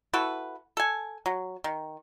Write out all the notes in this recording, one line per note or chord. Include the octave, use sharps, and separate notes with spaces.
E4 F#4 A4 B4
A4 G#5
F#3
D#3